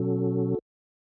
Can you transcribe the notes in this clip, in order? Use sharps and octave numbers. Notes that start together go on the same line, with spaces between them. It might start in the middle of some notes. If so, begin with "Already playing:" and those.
Already playing: B2 F#3 C#4 F#4 A4